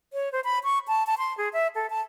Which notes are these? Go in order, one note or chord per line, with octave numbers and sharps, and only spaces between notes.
C#5
C5
B5
C#6
A5
A5
C6
G#4
E5
A4
A5